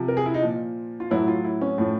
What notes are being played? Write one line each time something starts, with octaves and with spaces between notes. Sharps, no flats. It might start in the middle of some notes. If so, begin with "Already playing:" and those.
Already playing: C3 F3
A#4
G#4
E4
D#4
A#2 F3
F4
A2 F#3 E4
F4
E4
C#4
A2 F3